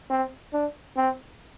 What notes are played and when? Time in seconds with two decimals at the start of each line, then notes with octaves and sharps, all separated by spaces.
0.10 C4
0.53 D4
0.96 C4